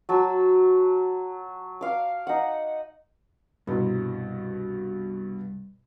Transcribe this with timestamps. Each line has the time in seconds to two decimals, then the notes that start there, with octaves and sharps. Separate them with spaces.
0.09 F#3 A5 E6
1.81 F5 D6
2.27 D#4 F#5
3.67 C2 G2 B2